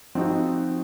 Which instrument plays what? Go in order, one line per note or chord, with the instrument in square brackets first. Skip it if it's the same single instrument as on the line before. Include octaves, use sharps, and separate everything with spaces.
[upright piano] F3 C4 D#4 F#4